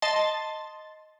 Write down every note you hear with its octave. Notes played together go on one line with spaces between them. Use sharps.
D#5 A5 C6 A6